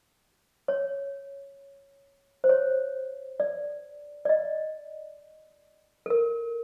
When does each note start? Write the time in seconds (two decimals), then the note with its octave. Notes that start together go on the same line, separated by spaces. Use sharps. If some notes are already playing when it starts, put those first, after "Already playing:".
0.68 C#5
2.44 C5
2.49 C#5
3.40 D5
4.25 D5
4.29 D#5
6.06 A4
6.10 A#4